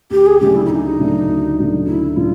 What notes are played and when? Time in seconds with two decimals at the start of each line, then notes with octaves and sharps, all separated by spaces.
0.10 D2 G4
0.26 G#4
0.40 C#3 F#3 A3 D4 G4
0.55 E4
0.65 E4
0.69 D2 D#4
0.98 C#3 F#3 A3 D4
1.28 D2
1.57 C#3 F#3 A3 D4
1.86 D2 E4
2.16 C#3 F#3 A3 D4 F4